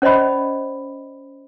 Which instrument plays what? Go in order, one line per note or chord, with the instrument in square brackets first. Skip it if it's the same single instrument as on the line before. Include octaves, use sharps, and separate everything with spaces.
[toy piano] C#4 C5 D5 D#5 B5